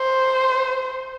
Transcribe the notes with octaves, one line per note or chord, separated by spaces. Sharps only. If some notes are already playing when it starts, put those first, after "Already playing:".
Already playing: C5